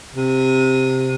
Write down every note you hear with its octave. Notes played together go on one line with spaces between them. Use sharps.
C3